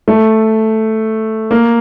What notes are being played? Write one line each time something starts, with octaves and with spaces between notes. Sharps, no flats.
A3
A#3